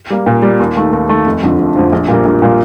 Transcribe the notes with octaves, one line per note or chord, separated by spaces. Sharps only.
G3 A#3
A#2
G3 A#3
D#2
D#3 A3
D#2
D#3 A3
F1
F2 D3 F3
F1
F2 D3 F3
A#1
A#2 G3 A#3
A#1
A#2 G3 A#3